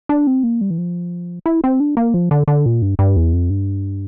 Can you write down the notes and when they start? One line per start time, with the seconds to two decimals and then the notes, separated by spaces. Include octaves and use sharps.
0.09 D4
0.27 C4
0.43 A#3
0.61 G3
0.70 E3
0.78 F3
1.46 E4
1.64 C4
1.80 D4
1.97 A#3
2.14 F3
2.31 D3
2.48 D3
2.66 A#2
2.82 G2
2.99 G2
3.16 E2
3.33 F2
3.50 G2